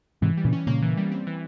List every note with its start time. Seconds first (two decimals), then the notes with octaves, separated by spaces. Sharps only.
0.22 G#2 C3 E3
0.37 G3
0.45 A#2 C#3
0.53 C#4
0.67 A#2 C#3 A#3
0.82 E3
0.97 G3
1.12 C4
1.27 E3